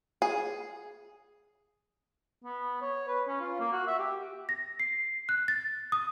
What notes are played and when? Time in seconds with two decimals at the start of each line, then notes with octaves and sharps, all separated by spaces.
0.22 G#4
2.44 B3
2.81 C#5
3.08 B4
3.28 C#4
3.41 F4
3.60 A#3
3.72 F#4
3.87 E5
3.99 G4
4.49 A#6
4.80 C7
5.29 F#6
5.48 A6
5.92 D#6